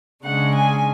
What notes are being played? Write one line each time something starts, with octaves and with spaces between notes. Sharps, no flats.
C#3 G#3 D4 F#5
G#5